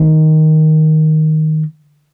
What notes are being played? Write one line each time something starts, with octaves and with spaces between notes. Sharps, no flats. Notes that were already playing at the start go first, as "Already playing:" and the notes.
Already playing: D#3